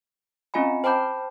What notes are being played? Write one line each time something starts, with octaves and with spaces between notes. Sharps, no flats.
C4 C#4 F4 D#5 G#5 B5
C5 G5 A5 B5 D6 G6